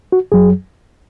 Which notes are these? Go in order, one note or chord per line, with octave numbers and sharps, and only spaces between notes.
F#4
F#2 F#3 G#4